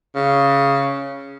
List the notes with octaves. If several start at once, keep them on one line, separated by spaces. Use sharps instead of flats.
C#3